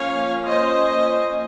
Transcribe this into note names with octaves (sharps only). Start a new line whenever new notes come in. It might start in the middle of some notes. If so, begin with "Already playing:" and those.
Already playing: F3 A#3 C#4 C#5 F5
C5 D#5